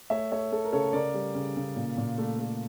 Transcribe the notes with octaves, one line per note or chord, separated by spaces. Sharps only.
A3 C#5 E5
A3 C#5 E5
A3 A4
A#4
C#3 A4 C#5
C#3 A#4 D5
G3
C#3
C#3
A#2
A#2
A3
A3